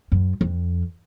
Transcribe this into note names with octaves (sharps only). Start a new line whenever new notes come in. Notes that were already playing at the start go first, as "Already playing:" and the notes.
F#2
F2